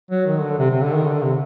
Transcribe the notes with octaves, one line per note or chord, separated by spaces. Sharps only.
F#3
D#3
D3
C3
C3
D3
D#3
D3
C3